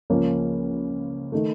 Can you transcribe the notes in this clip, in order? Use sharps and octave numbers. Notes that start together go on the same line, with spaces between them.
C#2 C#3 F3 A#3 C#4
D#3 A3